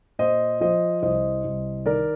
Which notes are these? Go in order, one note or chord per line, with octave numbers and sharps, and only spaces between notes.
A#2 C5 D#5
F3 C5 D#5
C2 C5 D#5
C2
D#3 A#4 D5